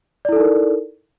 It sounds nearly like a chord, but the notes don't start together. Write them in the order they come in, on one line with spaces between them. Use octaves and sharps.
D5 E4 A4 D#4 A#4